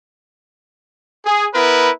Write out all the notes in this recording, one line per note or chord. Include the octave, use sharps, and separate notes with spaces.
G#4
B3 E4 A#4 B4